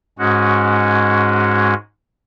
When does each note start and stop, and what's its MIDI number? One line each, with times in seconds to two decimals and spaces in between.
0.19 1.74 44
0.19 1.74 56
0.19 1.74 61
0.19 1.74 66